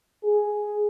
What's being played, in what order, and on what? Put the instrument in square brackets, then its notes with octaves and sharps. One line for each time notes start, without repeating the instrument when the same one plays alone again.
[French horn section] G#4